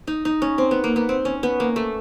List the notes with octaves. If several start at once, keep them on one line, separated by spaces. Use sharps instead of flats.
D#4
D#4
C#4
C4
B3
A#3
B3
C4
C#4
B3
A#3
A3